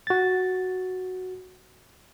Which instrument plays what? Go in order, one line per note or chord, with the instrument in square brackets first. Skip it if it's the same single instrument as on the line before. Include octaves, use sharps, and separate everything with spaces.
[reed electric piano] F#4 A6